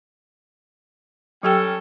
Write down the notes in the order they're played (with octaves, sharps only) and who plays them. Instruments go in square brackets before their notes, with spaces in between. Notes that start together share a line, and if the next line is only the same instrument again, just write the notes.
[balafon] F#3 G4 G5 [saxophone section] G3 C#4 A4